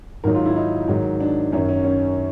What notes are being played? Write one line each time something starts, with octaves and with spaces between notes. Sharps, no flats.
G#2 D#3 F#3 A#4
F4
E4
D#4
G#2 D#3 F#3
D4
F#2 D#3 F#3 C#4
C#4
C#4